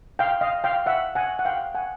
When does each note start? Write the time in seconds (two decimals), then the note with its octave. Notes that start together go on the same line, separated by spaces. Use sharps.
0.19 F5 G5
0.41 D#5 F5
0.64 F5 G5
0.86 E5 F#5
1.15 F#5 G#5
1.39 F#5
1.45 F5 G5
1.75 F#5 G#5